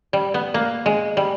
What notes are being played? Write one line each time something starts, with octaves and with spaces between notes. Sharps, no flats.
G3
B3
A#3
G#3
G3